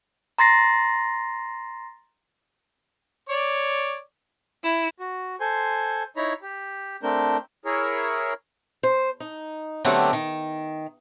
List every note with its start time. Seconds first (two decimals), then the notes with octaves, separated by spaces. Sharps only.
0.38 A#5 C6 A6 A#6 C7
3.29 C#5 D5
4.63 E4
5.00 F#4
5.40 A4 C5 G#5 C6
6.17 D#4 E4 C#5 A#5 B5
6.42 G4
7.03 A3 C4 D4 A#4 G6
7.65 E4 G#4 A#4 C#5
8.83 C5
9.20 D#4
9.85 D3 F#3 A3 B3 C4 G4
10.13 D#3